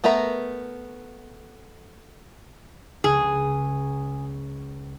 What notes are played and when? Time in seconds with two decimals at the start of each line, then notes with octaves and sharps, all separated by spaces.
0.04 A3 B3 A#4 E5 A#5
3.04 C#2 C#3 G#4